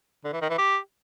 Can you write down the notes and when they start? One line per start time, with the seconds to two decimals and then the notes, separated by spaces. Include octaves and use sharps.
0.25 D3
0.33 E3
0.41 D#3
0.50 E3
0.58 G4